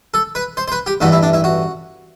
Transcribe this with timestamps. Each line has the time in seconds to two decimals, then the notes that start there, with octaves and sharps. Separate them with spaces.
0.14 A4
0.35 B4
0.57 C5
0.68 C5
0.72 B4
0.86 G4
1.01 A1 G2 E3 A3 F#4
1.12 E4
1.23 D4
1.33 E4
1.44 F#4